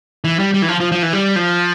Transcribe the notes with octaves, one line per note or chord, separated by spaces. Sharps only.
E3
G3
G3
E3
F3
F3
F3
E3
G3
F3